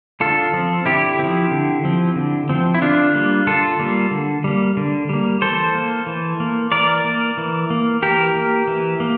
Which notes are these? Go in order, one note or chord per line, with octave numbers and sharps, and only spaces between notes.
D3 F4 A4
F3 C4
D3 E4 G4
F3 C4
D3
F3 C4
D3
F3 C4
E4
D3 D4 F4
G3 A#3
D3 F4 A4
G3 A#3
D3
G3 A#3
D3
G3 A#3
E3 A4 C5
A#3
E3
A#3
E3 A#4 D5
A#3
E3
A#3
E3 G4 A#4
A#3
E3
A#3